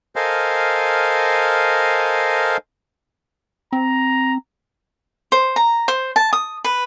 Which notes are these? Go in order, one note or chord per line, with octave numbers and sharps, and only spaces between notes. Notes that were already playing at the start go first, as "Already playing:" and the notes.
A4 A#4 C5 D#5 F5 G#5
C4 A#5
C5
A#5
C5
A5
D#6
B4